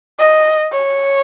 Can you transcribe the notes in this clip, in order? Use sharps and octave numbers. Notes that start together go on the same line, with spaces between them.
D#5
C#5